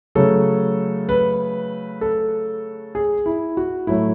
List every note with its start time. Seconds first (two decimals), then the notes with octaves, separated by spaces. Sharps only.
0.15 C#3 F#3 A3 A4
1.09 B4
2.01 A4
2.95 G#4
3.26 E4
3.57 F#4
3.87 A2 F#3 A3 E4